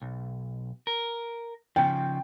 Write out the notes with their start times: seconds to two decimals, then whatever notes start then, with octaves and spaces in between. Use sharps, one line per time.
0.01 B1
0.87 A#4
1.76 C#3 F3 G5